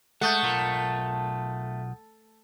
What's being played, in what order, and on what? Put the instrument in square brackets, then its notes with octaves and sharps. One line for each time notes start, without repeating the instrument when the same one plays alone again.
[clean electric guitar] G#3 [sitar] A3 [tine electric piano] F#5 D#6 G6
[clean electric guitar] B1 F4 A#4